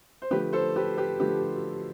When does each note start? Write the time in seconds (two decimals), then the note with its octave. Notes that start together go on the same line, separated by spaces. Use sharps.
0.22 C5
0.31 D3 F3 A3 G4 B4
0.53 A4 C5
0.76 G4 B4
0.97 G4 B4
1.20 D3 F3 A3 G4 B4